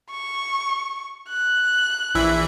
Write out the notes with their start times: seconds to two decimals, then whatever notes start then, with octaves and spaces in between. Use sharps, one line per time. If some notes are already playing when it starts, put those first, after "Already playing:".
0.11 C#6
1.29 F#6
2.15 A#1 E3 E5